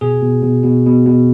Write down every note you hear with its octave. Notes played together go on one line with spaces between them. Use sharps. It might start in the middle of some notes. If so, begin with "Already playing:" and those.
B2 G#4
B2
B2
B2
B2
B2